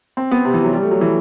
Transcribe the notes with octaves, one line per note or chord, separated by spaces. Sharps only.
C4
B3
C3
E3
F#3
G3
A3
F#3
E3